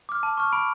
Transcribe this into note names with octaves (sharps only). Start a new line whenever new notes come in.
D6 F6
A5
C#6 F6
B5 D7